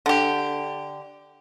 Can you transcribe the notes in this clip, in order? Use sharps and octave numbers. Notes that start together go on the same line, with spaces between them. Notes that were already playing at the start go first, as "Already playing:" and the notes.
D3 G4